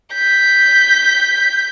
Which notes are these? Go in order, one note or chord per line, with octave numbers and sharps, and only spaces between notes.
G6 B6